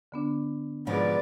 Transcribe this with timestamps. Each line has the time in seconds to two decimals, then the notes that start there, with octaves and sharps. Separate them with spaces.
0.12 D3 B3 D4
0.87 G#2 B2 F3 F#4 G#4 B4 D5